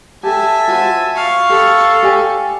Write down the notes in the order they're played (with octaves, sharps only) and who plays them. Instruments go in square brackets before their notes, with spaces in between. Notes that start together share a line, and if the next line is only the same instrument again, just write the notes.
[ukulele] G4 A4 [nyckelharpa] E5 G#5 [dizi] A5
[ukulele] F4 F#4 C5
[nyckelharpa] F5 C#6
[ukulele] G4 [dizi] A4
[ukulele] G4 D5 G#5